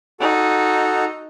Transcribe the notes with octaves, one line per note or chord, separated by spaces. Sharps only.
D#4 F#4 A4